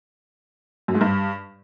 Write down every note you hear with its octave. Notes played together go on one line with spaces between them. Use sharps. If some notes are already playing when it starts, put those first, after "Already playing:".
F#2
G#2
G2